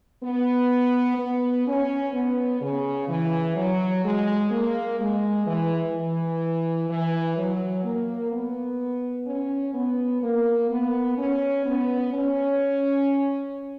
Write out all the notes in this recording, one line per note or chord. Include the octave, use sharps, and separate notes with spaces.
B3
B3
C#4
B3
C#3
E3
F#3
G#3
A#3
G#3
E3
E3
E3
F#3
A#3
B3
C#4
B3
A#3
B3
C#4
B3
C#4